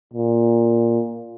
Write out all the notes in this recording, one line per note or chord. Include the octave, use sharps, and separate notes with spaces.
A#2